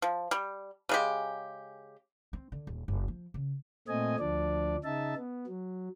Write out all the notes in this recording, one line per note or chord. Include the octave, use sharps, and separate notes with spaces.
F3
G3
C#3 G#3 G4
C4
D3
D#1
F#1
F3
C#3
A#2 A3 C4 D#5 G#5
D2 F3 D4 D5
C#3 D#4 E5 A5
B3
F#3